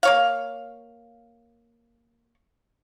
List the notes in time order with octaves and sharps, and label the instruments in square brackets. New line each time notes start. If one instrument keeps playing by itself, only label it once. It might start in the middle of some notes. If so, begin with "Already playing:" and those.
[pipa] A#3 C#5 F5